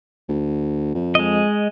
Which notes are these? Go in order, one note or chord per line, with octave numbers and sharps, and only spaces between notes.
D2
F2
G#3 D#5